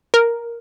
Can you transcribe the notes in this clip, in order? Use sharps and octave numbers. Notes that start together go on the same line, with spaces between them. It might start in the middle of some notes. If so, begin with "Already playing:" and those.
A#4